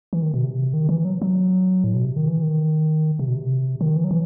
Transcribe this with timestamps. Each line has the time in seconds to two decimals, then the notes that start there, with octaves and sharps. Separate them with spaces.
0.13 E3
0.23 D#3
0.34 B2
0.44 C3
0.74 D#3
0.89 E3
1.05 F#3
1.22 F#3
1.84 A2
1.94 B2
2.05 C3
2.16 D#3
2.27 E3
2.43 D#3
3.19 C3
3.28 B2
3.34 C3
3.81 D#3
3.96 E3
4.04 F#3
4.11 E3